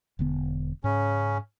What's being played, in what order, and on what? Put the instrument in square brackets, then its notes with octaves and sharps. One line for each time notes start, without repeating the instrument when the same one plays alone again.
[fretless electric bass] E1 D3 B3
[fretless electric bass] G#2 [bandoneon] C#3 C#4